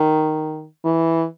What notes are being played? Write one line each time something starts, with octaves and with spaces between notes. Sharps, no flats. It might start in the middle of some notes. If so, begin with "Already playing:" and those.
Already playing: D#3
E3